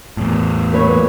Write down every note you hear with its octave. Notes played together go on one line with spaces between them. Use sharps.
E2 A2
A#3 B4 C#5